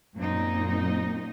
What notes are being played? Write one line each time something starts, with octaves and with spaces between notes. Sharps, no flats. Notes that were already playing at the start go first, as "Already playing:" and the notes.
F#2 A#2 F#3 A#3 C4 D#4